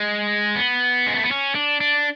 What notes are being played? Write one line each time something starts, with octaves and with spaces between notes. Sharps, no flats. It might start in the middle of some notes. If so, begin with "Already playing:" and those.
Already playing: G#3
B3
G#3
A3
B3
C#4
D4
D4